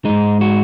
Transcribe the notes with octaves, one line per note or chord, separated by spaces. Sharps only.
G#2 G#3 D#4
F#4